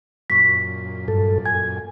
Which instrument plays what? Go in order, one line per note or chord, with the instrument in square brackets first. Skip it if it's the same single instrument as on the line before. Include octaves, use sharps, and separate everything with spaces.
[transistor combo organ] F#2 A#2 [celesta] C#6 B6
[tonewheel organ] G2 A4
[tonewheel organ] G#5 [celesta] G#6